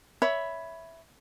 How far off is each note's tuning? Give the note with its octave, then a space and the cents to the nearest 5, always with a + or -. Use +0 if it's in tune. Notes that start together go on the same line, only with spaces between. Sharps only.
C#5 +15 E5 +0 B5 +0